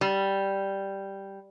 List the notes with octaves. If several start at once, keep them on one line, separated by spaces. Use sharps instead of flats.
G3